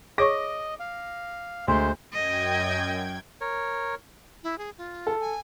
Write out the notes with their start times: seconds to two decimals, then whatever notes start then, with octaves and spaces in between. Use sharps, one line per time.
0.18 G#4 C#5 D#5 C#6 D6 A#6 D7
0.80 F5
1.68 D2 G#3 C5 C6
2.12 F#2 D#5 G5 G#6
3.41 A#4 C#5
4.43 E4
4.58 G#4
4.78 F4
5.07 A4
5.20 G#5